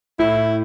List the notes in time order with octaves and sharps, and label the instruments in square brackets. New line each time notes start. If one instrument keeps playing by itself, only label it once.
[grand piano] A2 [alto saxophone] E4